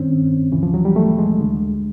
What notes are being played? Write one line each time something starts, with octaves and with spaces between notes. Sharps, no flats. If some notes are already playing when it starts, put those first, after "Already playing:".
Already playing: G2 D#3 C4 C#4
D2 C#3 E3
F3
F#3
G3
A3
G#3
D2 D3